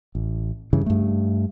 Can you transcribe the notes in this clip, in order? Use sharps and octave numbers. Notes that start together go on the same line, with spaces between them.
A1
G2 C#3 E3
G2 A3